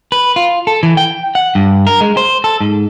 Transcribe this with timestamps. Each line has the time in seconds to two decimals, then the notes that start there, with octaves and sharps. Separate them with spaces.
0.12 B4
0.36 F4
0.67 A4
0.83 E3
0.97 G5
1.35 F#5
1.55 G2
1.87 A#4
2.01 G#3
2.17 C5
2.44 A4
2.61 G#2